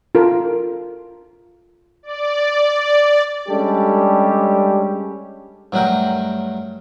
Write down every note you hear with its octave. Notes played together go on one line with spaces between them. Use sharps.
F4 A4 A#4
D5
G3 G#3 C#4 D4 G4 A4
G2 F#3 A3 F#4 A#4 G5